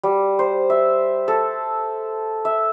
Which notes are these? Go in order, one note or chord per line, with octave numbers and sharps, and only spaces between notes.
G3
C5
E5
A4
E5